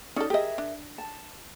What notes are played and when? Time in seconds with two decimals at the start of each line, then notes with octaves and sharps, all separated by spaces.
0.16 C#4 D#4 F#4 A4 D5
0.30 G4 G#4 A#4 D#5 E5
0.58 D4
0.98 A5